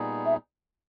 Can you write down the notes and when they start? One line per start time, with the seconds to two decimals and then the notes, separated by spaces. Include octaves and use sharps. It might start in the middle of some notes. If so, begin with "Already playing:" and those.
Already playing: A#2 G3 B3 D#4 G#4
0.26 E5